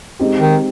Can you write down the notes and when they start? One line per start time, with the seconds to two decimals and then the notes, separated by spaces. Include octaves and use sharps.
0.19 G#3 C4 D#4 G4
0.39 D#3